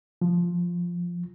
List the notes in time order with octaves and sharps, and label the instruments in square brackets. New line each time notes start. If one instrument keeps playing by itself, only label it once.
[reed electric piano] F3